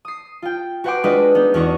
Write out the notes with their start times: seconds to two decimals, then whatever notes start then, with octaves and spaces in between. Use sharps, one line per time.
0.05 D#6 C7
0.42 F4 G5
0.84 F#4 B4 F#5 G5 C6 D6
1.04 G#3 D4 F4 B4 D#5
1.35 B3 D#4
1.54 E2 C#4 D4 F#4 C#6